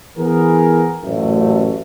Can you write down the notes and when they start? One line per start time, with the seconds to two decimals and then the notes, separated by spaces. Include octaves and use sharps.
0.18 E3 B3 G#4 A#4
1.04 A1 F#2 A#2 A3